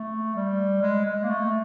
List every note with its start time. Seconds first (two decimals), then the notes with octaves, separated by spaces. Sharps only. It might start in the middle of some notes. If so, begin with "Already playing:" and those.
Already playing: A3
0.36 G3
0.82 G#3
1.06 G#3
1.24 A#3
1.30 A3